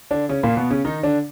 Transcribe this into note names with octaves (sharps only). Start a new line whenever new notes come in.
D3 D4
C#3 C#4
A#2 A#3
B2 B3
C#3 C#4
D#3 D#4
D3 D4